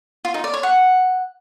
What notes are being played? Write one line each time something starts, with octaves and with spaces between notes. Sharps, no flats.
F4
D#4
D5
C#5
F#5